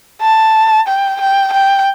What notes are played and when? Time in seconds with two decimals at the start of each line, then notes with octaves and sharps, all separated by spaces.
0.22 A5
0.88 G5
1.21 G5
1.53 G5